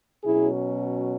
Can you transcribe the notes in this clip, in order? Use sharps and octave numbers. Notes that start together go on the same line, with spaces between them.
B2 F#3 C#4 E4 G#4